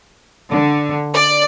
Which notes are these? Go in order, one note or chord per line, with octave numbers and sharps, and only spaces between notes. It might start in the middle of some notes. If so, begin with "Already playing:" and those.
D3
D5